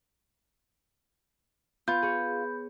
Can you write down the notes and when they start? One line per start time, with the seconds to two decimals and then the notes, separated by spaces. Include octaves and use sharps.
1.88 B3 F4 B5 G6
2.02 G#4 C#5